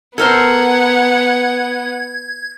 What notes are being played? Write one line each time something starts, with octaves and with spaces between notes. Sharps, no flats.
B3 A4 A#4 C5 F#5 G#6